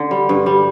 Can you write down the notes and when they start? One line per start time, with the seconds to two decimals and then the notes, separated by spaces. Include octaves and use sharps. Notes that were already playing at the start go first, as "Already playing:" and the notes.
Already playing: D3
0.11 G3
0.29 G2
0.46 G3